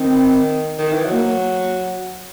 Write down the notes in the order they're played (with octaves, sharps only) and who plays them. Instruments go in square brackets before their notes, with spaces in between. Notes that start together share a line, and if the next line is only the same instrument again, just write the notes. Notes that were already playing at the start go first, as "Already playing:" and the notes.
Already playing: [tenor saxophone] D#3 [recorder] C4
[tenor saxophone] D#3
E3
F#3
[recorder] A#3